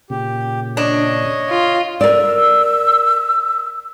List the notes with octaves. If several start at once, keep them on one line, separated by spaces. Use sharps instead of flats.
A#2 C#3 G4
D4 C#5 D#5
F4
A#4 D5 E6